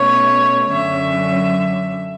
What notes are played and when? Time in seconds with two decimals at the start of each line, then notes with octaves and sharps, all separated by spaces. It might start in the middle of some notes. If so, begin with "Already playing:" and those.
Already playing: B2 A3 C#4 C#5
0.71 F#2 D3 F#3 C#4 E5